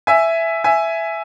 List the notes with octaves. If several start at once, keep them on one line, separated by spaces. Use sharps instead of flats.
E5 G#5
E5 G#5